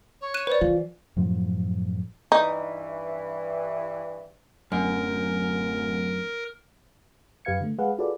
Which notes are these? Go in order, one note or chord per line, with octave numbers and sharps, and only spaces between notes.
C#5
F#6 D#7 E7
B4 C5 D5
E3 F4
F#2 A2 F3 F#3
G2 E3 D#4
D1 F#2 A#4
F#2 G4 B4 F5 G#6 C#7
D3 A3
G#3 G#4 B4 F5 F#5
F4 F#4 G#4 A4 B4 D5